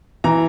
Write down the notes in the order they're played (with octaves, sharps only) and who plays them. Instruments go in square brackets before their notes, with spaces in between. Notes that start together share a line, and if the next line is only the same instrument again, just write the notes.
[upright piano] E3 A#5